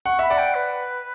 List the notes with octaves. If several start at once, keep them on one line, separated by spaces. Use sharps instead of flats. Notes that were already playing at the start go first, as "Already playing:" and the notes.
F#5 C#6
E5 B5
D5 F#5
G5
B4